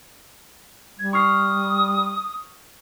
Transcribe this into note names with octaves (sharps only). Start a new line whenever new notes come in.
G3 G#6
C#6 D#6 F6 C7